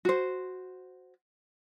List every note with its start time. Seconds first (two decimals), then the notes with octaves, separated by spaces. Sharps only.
0.05 F#4 C5